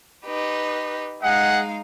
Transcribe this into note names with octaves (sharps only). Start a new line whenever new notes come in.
D#4 G4 B4
G#3 D#4 G#4 D#5 F5 F#5